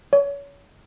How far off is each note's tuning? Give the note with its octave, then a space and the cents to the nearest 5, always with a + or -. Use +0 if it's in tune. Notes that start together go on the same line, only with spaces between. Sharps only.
C#5 +30